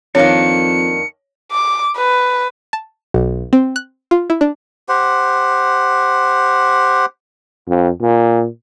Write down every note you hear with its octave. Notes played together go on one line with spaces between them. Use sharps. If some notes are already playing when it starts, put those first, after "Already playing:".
F2 D#3 A#3 D4 C#5 C#7
D6
B4
A5
B1
C4
F#6
F4
E4
D4
G4 C5 F#5
F2
A#2